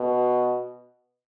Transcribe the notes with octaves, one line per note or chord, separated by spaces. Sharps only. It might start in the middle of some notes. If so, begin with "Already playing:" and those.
Already playing: B2